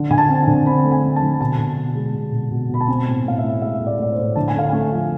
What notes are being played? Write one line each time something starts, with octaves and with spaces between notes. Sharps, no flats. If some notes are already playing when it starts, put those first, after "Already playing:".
Already playing: D3
D3 G#5
A5
C4
A5
D3
C4 B5
A3
G#5
A3
A5
D3
B2 A5
B2
B2
G#3
B2
B2
B2
B2 B5
A5
C4 G#5
A2
A2 F5
E5
A2
G#3 E5
A2
D5
A2 D5
C5
A2
D3 A5
G#5
A3 F5
A3 G#5
F3